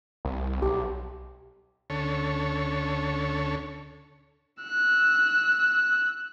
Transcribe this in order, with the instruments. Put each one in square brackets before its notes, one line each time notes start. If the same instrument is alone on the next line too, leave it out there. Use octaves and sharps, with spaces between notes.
[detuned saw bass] C2
[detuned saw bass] B1 [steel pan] G4
[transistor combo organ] D2 D3 C#4 A4 C#5
[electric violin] E6 F#6